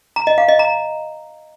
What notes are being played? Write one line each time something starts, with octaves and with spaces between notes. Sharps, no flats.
A#5
D#5
F5
D#5
A#5